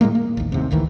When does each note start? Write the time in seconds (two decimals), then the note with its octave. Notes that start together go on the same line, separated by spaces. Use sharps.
0.01 A2 G3 G#3 A#3
0.15 A#3
0.37 A1 D#2
0.52 D#2 C3
0.71 G#1 D2 D#3 E3